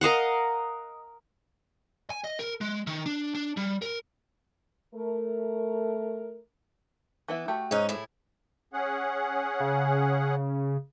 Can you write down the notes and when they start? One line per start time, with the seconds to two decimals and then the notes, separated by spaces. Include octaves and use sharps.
0.01 A#4 D#5 F5 F#5
2.10 G#5
2.24 D#5
2.39 A#4
2.61 G#3
2.87 D#3
3.06 D4
3.35 D4
3.57 G3
3.82 A#4
4.94 A3 A#4
7.28 E3 B3 E4
7.48 A3 F#4 G4
7.71 G#2 C#4 D#4 G#4
7.89 A2 E4
8.73 C#4 G#4 F#5
9.60 C#3